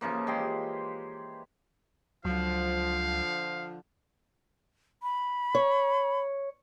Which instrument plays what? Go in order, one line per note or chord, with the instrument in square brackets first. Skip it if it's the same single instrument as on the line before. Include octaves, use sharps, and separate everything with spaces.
[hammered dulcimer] C#3 E3 F3 A#3
G#3 G4 C6
[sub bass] C#2 [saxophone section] D3 F3 [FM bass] F#3 [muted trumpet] F5
[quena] B5
[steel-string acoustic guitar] C#5